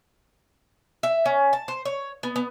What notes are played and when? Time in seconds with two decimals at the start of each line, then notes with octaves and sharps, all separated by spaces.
1.03 E5
1.26 C#4
1.53 A5
1.68 C5
1.85 C#5
2.23 B3
2.36 B3